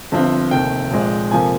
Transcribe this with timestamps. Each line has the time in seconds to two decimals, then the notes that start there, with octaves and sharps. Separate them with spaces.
0.12 G1 G2 F3 C4
0.51 F1 D#2 D#3 G5
0.91 A#1 A#2 G#3
1.31 F2 C3 F3 A#3 G#5